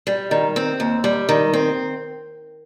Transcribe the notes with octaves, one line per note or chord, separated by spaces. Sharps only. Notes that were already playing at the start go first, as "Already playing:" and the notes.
G3
D#3
C4
D#2
G3
D#3
C4